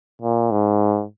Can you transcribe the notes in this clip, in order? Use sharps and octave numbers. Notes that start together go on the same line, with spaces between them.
A#2
G#2